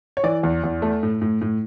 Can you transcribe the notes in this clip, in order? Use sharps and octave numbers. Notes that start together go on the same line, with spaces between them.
C#5
E3 D5
E2
E2
A3
A2
A2
A2